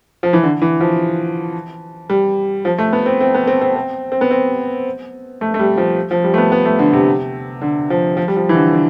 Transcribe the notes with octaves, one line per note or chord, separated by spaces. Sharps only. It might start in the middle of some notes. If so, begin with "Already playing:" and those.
F3
E3
D3
E3
F3
G3
F3
A3
B3
C4
C4
B3
C4
C4
C4
C4
B3
C4
A3
A3
G3
F3
F3
G3
A3
B3
B3
A3
D3
C3
D3
F3
F3
G3
F3
E3
D3
D3